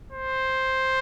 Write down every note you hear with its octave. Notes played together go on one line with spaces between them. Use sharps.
C5